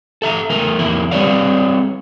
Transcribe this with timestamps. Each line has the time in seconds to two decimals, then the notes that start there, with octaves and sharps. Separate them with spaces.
0.22 A4 E5 A#5
0.50 E3 A3 A#4
0.79 F2 A#3 E4
1.11 G3 C4 B4 C#5 D5 F5